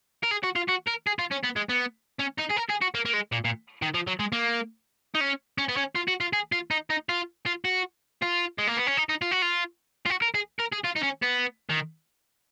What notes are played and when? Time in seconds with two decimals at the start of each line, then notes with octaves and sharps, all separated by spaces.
0.23 A#4
0.31 G#4
0.44 F#4
0.56 F4
0.68 F#4
0.87 A#4
1.07 G#4
1.19 F4
1.32 C#4
1.44 B3
1.56 G#3
1.69 B3
2.19 C#4
2.38 D#4
2.50 G#4
2.56 A#4
2.69 G#4
2.81 F#4
2.94 A#3
3.05 A#3
3.13 G#3
3.32 A#2
3.45 A#2
3.82 D#3
3.94 F3
4.07 F#3
4.20 G#3
4.32 A#3
5.15 D#4
5.21 C#4
5.58 C#4
5.69 B3
5.77 C#4
5.96 F4
6.08 F#4
6.21 F4
6.33 G#4
6.52 F4
6.71 D#4
6.90 D#4
7.09 F4
7.46 F4
7.65 F#4
8.22 F4
8.58 G#3
8.67 A#3
8.77 B3
8.87 C#4
8.97 D#4
9.09 D#4
9.22 F4
9.31 F#4
9.42 F4
10.06 F4
10.10 F#4
10.22 A#4
10.35 G#4
10.60 A#4
10.73 G#4
10.85 F4
10.96 D#4
11.03 C#4
11.23 B3
11.70 D#3